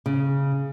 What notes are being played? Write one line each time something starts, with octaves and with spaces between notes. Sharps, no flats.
C#3